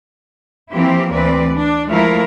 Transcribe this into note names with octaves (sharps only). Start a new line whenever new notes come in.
E3 F3 A#3 C4 E4 G4
D2 E3 C4 B4 D5
D4
F3 G#3 A3 E4 A#4 F5